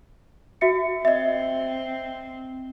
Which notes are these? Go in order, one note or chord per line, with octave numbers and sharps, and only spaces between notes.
F#4 E5 C#7
C4 D#5 E5